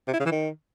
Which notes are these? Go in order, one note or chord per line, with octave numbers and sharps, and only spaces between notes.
C3
E4
C#3
E3
D#3